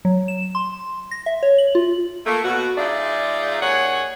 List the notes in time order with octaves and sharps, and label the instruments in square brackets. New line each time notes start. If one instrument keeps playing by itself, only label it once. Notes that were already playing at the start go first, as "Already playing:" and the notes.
[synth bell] F#3
E7
C6
A#6
E5
C#5
F#7
F4
[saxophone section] A3 A#3
B2 F#4
G#3 D#4 F4 G#4 D5 E5
D#2 G#4 C#5 F#5